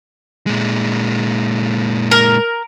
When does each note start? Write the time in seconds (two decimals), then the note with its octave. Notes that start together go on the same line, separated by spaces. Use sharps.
0.47 A#2 G#3
2.11 A#4